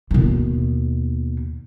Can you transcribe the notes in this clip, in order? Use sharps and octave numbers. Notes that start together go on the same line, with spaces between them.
D#2 B2